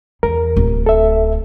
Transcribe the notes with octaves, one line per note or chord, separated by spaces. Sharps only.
E2 A#4
D1
A4 E5